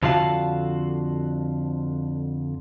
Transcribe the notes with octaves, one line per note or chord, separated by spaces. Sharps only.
F2 D3 F4 F#4 F5 A5